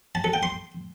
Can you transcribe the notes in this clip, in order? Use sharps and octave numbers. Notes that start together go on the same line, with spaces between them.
A5
A4
G5
C6